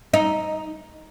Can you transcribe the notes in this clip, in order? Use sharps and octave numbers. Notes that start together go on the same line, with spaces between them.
D#4